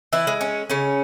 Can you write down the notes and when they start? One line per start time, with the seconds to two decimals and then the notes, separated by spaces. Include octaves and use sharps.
0.13 E3 E4
0.27 G#3
0.41 C#4
0.70 C#3 C#4